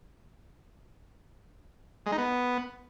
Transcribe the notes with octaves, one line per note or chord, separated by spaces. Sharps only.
G#3
D#4
B3